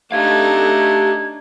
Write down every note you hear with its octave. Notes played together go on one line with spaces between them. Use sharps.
A3 D4 D#4 G4 F5 G#6